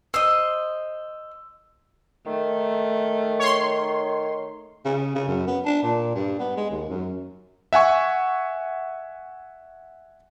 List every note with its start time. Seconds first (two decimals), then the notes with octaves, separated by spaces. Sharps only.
0.14 C5 D#5 E6
2.26 D#3 A3
3.40 C#5 C6
4.85 C#3
5.15 C#3
5.28 F#2
5.47 B3
5.65 D4
5.83 A#2
6.15 G2
6.39 B3
6.57 G#3
6.71 D#2
6.89 F#2
7.73 E5 F#5 G#5 C#6